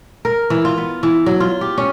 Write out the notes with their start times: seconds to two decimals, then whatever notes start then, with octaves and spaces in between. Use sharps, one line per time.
0.25 A#4
0.50 E3
0.65 F4
0.78 B3
1.03 E3
1.26 F#3
1.40 F4
1.61 G4
1.78 C#4